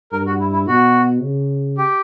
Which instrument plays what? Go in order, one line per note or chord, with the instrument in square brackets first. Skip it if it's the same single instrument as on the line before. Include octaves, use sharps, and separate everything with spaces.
[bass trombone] G2 [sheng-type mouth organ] A#4
[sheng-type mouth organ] F#4
E4
E4
[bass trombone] B2 [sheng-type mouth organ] F#4
[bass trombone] C#3
[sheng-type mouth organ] G4